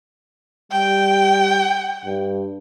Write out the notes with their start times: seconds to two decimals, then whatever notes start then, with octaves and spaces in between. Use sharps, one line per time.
0.72 G3 G5
2.05 G2